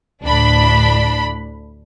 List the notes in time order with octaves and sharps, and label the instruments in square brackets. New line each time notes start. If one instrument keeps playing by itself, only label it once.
[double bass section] D2 A2 [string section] D4 B5